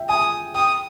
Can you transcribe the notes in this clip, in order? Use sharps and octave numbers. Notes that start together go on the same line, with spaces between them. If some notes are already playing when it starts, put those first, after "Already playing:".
Already playing: E5 G5
G#5 D#6
G5 D#6